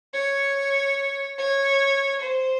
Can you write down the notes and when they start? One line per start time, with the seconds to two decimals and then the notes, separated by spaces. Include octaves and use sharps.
0.14 C#5
1.39 C#5
2.21 C5